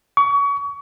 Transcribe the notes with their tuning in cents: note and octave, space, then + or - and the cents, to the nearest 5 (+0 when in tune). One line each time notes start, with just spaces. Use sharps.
C#6 +30